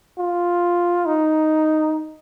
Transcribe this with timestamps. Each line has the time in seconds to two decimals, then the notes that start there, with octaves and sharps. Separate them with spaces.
0.18 F4
1.06 D#4